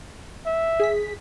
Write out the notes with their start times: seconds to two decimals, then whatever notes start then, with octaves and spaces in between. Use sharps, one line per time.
0.46 E5
0.80 G#4 B6